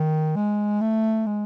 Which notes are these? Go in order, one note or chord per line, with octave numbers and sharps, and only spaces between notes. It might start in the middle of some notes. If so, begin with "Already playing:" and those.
Already playing: D#3
G#3
A3
G#3